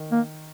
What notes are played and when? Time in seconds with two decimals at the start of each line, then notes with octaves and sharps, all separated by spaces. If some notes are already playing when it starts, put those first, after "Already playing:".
Already playing: D#3
0.12 A#3